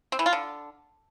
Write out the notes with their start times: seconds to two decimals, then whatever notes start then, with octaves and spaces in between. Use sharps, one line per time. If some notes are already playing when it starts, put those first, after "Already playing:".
0.12 C4
0.19 E3
0.26 F4
0.33 D3